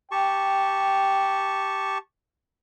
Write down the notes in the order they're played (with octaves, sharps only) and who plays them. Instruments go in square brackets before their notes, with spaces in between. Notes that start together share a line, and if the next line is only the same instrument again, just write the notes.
[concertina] G4 A5 C#6 [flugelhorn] G5